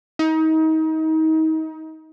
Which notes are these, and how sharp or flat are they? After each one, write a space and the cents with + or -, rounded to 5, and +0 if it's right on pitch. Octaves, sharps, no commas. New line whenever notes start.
D#4 +30